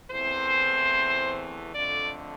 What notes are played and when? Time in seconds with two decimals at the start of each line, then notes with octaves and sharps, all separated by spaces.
0.11 E2 E3 A3 C4 C5
1.74 F2 D3 A3 D5